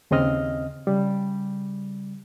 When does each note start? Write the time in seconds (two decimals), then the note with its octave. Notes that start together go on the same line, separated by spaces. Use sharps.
0.11 D#2 C#3 C4 D#5 F6
0.87 C#3 G3